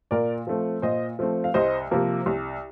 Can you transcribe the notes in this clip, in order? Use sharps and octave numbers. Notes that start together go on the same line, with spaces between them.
A#2 A#4 D5
F3 A3 C4
A#2 C5 D#5
F3 A3 C4
F5
C2 C5 D#5
C3 F3 A#3
C2